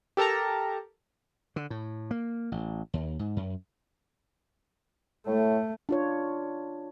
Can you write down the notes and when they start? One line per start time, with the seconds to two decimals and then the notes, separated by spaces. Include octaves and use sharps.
0.17 G4 A4 A#4 A5 A#5
1.56 D3
1.70 A2
2.11 A#3
2.52 A1
2.93 D#2
3.19 G#2
3.37 F#2
5.27 A2 A3
5.89 D4 F4 C#5